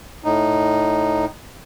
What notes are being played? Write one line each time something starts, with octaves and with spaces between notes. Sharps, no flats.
A2 D#4